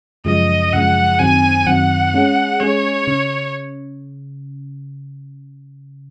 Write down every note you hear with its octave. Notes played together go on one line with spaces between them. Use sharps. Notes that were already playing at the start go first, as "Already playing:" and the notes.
F#2 C#3 F3 G#3 D#5
F#2 C#3 F3 G#3 F#5
F#2 D#3 F#3 C4 G#5
F#2 D#3 F#3 C4 F#5
G#3 C#4 G#4
G#3 C#4 G#4 C#5
C#3